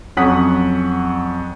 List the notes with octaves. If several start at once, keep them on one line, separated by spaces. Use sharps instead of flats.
F2 F#3 C#4 F#5 D#6 B6